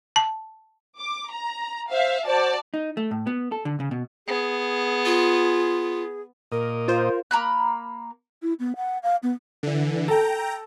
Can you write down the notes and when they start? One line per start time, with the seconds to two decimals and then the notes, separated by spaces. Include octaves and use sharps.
0.16 A5
0.99 D6
1.32 A#5
1.91 C5 E5 F5
2.27 F#4 C5 D5 A5
2.74 D#4
2.97 A3
3.11 A2
3.27 B3
3.52 A4
3.65 D3
3.80 C#3
3.91 B2
4.27 B3 G#4
5.06 F4
6.52 A#2 A#4 D#5
6.88 F4 C5
7.31 A#3 A#5 B5 F#6
8.42 E4
8.60 B3
8.77 F#5
9.03 F5
9.23 B3
9.63 D3 E3
10.08 A4 G5 A#5